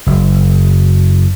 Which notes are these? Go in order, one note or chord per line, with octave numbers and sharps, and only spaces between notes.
F#1